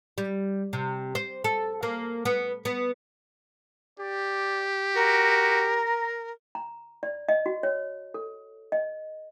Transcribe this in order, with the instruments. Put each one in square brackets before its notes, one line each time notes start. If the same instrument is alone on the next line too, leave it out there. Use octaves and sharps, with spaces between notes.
[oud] G3
C3
C5
A4
A#3
B3
B3
[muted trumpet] G4 [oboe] D5
[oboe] F#4 [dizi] A#4
[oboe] A#5
[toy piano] A#5
D5
D#5
F#4
C#5
A4
D#5